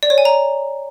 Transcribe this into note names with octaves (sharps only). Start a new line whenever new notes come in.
D5
C#5
G#5
A#5